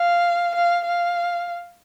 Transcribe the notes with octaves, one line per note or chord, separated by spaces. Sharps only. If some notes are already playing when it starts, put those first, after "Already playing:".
Already playing: F5
F5
F5